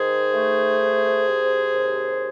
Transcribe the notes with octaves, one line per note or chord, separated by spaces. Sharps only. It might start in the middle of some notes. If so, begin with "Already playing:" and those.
Already playing: D#3 G#4 C5
A3
C2
C3
D#2